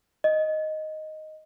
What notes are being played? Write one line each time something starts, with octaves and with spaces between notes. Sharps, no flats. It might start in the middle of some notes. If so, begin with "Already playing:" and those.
D#5